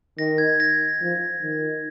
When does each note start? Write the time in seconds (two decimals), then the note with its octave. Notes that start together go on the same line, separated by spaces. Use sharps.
0.18 D#3 A#6
0.38 G#6
0.60 A#6
1.01 F3
1.42 D#3